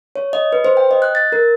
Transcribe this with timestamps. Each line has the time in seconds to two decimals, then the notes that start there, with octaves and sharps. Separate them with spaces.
0.16 C#5
0.33 D#5
0.53 B4
0.65 C5
0.77 G5
0.91 D#5
1.02 F#6
1.15 A6
1.32 A#4